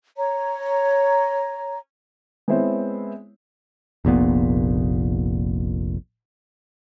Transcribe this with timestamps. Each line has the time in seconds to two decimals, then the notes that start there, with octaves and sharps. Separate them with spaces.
0.16 C#5 A#5
2.48 G#3 B3 C4 E4 C5 C#5
4.05 F1 A#1 A#2 B3